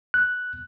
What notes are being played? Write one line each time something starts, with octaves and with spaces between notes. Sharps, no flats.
F#6